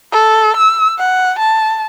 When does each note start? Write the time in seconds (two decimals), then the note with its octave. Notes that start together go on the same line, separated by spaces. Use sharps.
0.12 A4
0.57 E6
0.99 F#5
1.39 A5